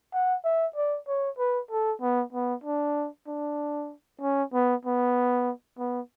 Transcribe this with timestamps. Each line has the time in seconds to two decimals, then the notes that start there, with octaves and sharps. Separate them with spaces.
0.14 F#5
0.44 E5
0.76 D5
1.08 C#5
1.38 B4
1.71 A4
2.01 B3
2.32 B3
2.64 D4
3.27 D4
4.21 C#4
4.53 B3
4.85 B3
5.79 B3